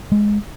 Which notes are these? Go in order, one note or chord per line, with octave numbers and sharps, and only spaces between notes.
G#3